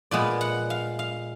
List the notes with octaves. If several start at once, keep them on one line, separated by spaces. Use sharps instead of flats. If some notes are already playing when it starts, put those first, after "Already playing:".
A#2 G#3 B3 D5
F#5
F5
F5